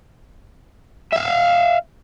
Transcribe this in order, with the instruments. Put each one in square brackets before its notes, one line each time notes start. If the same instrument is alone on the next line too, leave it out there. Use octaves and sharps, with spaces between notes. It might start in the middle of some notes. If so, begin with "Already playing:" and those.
[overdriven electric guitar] E5 F5